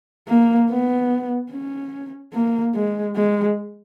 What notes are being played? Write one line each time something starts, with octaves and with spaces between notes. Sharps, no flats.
A#3
B3
C#4
A#3
G#3
G#3